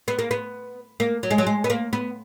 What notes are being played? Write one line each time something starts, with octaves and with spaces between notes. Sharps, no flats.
B3
A#3
B3
A#3
F#3
G#3
F#3
G#3
B3
A#3
B3